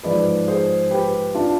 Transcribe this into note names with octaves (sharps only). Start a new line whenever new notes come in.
G#2 F3 G#3 B4 D5
G#4 C5
G4 B4
D4 F4